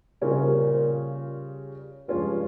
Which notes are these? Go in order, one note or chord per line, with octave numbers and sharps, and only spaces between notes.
A#2 C#3 G3 C#4 F4
C3
A#2
G2 F3 G#3 C#4 F4